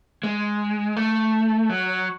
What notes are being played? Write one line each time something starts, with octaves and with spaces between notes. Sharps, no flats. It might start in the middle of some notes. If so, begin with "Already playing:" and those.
G#3
A3
F#3